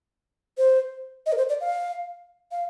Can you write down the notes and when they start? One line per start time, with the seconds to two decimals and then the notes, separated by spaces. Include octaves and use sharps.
0.58 C5
1.26 D#5
1.32 A#4
1.38 C5
1.49 D5
1.61 F5
2.52 F5